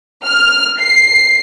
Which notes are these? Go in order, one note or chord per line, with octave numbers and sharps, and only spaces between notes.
F6
C7